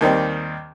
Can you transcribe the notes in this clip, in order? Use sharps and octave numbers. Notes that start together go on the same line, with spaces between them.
D#2 D#3 G3 C4